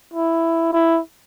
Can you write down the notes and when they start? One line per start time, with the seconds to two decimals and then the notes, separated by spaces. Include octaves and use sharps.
0.13 E4
0.73 E4